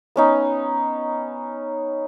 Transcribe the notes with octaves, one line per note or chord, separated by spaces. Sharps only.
B3 C#4 D#4